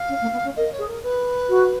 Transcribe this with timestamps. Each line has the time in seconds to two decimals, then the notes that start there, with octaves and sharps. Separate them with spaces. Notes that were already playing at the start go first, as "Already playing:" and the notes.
Already playing: F5
0.09 C#4
0.21 A#3
0.33 B3
0.44 C#4
0.56 A#4 D#5
0.72 C#5
0.79 G#4
0.87 A#4
1.03 B4
1.49 F#4